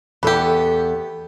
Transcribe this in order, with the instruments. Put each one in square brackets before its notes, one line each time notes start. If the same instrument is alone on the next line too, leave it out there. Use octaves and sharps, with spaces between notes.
[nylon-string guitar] E2 A4 [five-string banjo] B3 G4